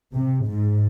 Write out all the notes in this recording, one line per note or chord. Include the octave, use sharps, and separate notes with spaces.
C3
G#2